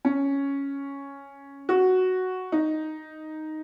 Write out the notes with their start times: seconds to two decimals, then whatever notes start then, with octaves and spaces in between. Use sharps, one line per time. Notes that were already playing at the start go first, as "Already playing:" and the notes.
0.05 C#4
1.69 F#4
2.52 D#4